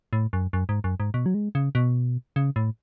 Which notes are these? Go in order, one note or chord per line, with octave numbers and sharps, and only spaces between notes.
A2
F#2
F#2
G#2
F#2
G#2
B2
F#3
G#3
C#3
B2
C#3
A2